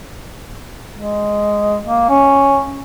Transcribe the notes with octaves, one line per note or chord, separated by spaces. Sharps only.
G#3
A#3
C#4